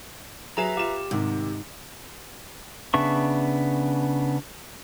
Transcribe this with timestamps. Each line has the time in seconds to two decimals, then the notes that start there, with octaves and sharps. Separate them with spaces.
0.57 F#3 G#4 B4 E5 A#5 E7
0.77 F4 G4 E7
1.11 G#2 C3 D#3
2.94 C#3 B3 D4 E5 C#6